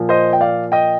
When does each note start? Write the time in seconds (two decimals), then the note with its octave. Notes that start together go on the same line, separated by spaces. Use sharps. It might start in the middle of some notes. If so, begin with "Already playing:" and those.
Already playing: A#2 F3
0.09 C5 D#5
0.33 G5
0.41 D5 F5
0.72 D#5 G5